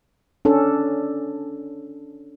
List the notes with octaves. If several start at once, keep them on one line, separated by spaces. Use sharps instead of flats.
C#4 D4 A4